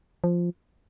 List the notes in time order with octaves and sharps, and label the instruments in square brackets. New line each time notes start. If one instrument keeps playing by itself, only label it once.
[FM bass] F3